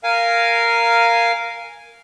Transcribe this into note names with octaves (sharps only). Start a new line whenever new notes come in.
A#4 F5 G#5